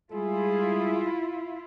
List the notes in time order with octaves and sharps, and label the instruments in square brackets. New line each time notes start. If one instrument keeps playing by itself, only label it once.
[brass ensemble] G3 G#3 G#4 [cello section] E4 F4